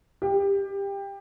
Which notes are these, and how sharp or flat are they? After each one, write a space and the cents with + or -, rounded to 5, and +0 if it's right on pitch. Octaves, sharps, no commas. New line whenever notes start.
G4 +20